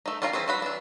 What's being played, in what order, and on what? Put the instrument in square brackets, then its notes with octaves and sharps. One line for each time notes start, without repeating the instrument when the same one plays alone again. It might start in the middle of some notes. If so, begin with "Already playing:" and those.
[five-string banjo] A3 D#4
G3 C#4 F4 A#4 F5
E3 C4 C#4 G#4
F#3 F#4 B5
E3 D4